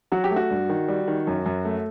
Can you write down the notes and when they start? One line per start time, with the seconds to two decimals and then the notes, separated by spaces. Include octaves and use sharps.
0.12 F#3 F#4
0.24 G4
0.31 A3
0.36 F#4
0.50 G2
0.69 D#3
0.88 G3
1.07 D#3
1.27 F#2
1.46 F#2
1.65 A3